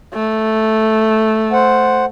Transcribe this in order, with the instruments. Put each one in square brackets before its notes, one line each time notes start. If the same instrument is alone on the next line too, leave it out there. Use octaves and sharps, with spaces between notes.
[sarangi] A3
[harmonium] C5 F#5